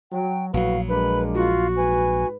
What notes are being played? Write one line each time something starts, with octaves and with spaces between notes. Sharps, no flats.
F#3 G5
A#1 A2 F#3 F#4 B4 F5
G#3 A#3 D4 B4 B5
F4 F#4
G#2 B4 G#5